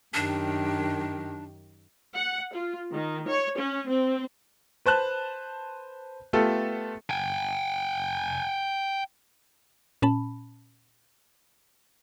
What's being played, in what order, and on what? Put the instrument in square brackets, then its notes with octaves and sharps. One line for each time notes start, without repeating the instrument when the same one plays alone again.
[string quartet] F#2 D#3 G4 [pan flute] D4
[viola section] F#5
F4
D#3
C#5
C#4
C4
[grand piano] B4 C5 A5 F#6
A3 B3 F4 G4 A4
[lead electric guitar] G5 G#5
[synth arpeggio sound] A#2 C#4 A5 B5